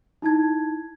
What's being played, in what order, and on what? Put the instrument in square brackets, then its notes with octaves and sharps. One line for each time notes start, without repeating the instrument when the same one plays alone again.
[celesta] D#4 E4 A5 G#6